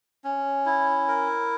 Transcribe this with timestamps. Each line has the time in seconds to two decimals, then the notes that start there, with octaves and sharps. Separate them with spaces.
0.24 C#4
0.66 E4
1.08 A#4